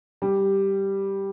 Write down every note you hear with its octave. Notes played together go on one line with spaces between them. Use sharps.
G3